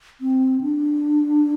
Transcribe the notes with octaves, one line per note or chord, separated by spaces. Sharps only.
C4
D4